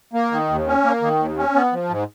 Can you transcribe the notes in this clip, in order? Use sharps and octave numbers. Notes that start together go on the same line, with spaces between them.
A#3
D#3
D#2
C#4
A#3
D#3
D#2
C#4
B3
F3
G#2